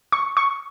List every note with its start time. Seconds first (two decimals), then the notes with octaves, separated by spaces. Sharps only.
0.12 C#6
0.37 C#6